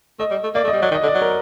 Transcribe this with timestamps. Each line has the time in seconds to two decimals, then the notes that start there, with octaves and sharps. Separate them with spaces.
0.19 A3 D#5
0.31 G3
0.43 A3
0.55 A#3 D5
0.64 A3
0.68 G3 D#5
0.82 F#3 D5
0.91 D#3
0.94 D#5
1.03 D3
1.08 D5
1.15 F#3
1.22 A#4